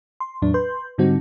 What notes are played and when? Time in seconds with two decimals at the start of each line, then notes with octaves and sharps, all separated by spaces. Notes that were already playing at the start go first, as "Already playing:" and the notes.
0.20 C6
0.42 E2 A2 F#3 D4
0.54 B4 C6 G6
0.98 G#2 D3 G3 C4 D#4 F#4